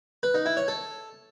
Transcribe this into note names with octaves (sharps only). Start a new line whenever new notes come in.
B4
D#4
E4
C#5
A4